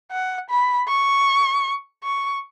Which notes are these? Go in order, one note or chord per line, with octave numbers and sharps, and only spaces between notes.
F#5
B5
C#6
C#6